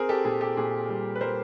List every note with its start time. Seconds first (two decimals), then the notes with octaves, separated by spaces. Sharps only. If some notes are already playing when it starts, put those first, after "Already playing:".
Already playing: C4 G#4 A#4
0.09 G4 A4
0.25 A#2 G#4
0.41 G4 A4
0.57 A#2 G#4
0.89 G3
1.15 B4
1.21 G3 A#4 C5